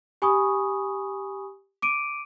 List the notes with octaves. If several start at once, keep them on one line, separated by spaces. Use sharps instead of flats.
G4 G#5 B5 C#6 D#6
D6 D7 D#7